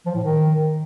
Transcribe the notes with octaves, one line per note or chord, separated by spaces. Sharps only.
F3
A2
D#3